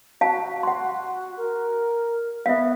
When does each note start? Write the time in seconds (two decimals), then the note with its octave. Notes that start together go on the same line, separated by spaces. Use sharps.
0.21 F#4 F5 A5
0.63 F#5 C6
1.37 A#4
2.46 B3 E5 F5